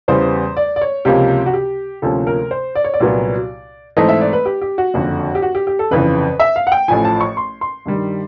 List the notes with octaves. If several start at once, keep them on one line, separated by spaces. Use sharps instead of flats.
E2 C#3 E3 G3 B3 C5
D5
D5
C#5
C#2 C3 F3 A#3 C#4 G4
F#4
G4
D2 C3 F3 A#3 C#4 A4
A#4
C5
D5
C#5
D5
C2 A#2 F#3 B3
G#2 E3 A3 C4 D#5
E5
D5
B4
G4
G4
F#4
F#1 F2 D3
G4
F#4
G4
G4
A4
G1 F2 C#3 E3 B4
E5
F5
F#5
G5
A1 A2 F3 G#5
A5
C#6
C6
C6
G2 D#3 G3